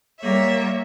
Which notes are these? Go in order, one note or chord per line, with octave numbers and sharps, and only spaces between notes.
G3 A#3 C#5 E5